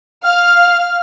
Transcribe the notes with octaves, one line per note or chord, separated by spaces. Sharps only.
F5 F6